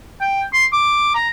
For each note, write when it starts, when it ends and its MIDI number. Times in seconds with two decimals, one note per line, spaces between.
0.21 0.42 79
0.53 0.65 84
0.73 1.10 86
1.15 1.30 82